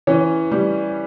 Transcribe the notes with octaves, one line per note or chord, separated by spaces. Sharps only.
E3 C#4
G3